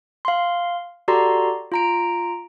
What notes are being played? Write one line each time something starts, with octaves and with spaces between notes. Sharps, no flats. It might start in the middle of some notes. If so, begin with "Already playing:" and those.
F5 C6
F#4 G4 A4 D5 A#5 C6
F4 A#5 D7